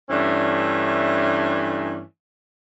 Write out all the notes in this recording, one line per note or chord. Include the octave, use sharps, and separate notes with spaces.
G2 E3 A3 C#4 D4